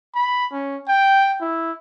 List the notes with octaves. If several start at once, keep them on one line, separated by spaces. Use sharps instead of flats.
B5
C#4
G5
E4